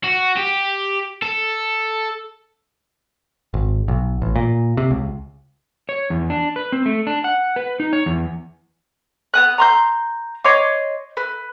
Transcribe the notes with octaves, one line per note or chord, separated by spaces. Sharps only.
F#4
G4
A4
G#1
B1
A1
A#2
C3
C#2
C#5
E2
D4
B4
C4
A3
D4
F#5
B4
D#4
C#5
E2
B3 D#6 F#6
A#5 C6 G6
C#5 D#5 C6 D6
B4